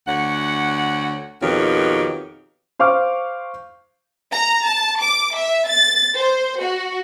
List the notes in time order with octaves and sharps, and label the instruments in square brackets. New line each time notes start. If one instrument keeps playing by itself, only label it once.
[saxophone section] D2 C#5 F#5
F2 B2 D#3 G4 C#5
[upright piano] C5 F5 C#6 D6 F6
[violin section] A#5
A5
D6
E5
A6
C5
F#4